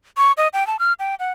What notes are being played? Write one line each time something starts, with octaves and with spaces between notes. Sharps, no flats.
C#6
D#5
G5
A5
F6
G5
F#5